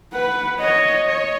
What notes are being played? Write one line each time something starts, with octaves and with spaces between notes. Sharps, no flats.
B4 F#5
C#5 D#5
C#5 D#5